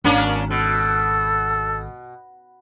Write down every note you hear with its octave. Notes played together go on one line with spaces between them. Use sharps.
G#1 A#3 C#4 D4
B2 A4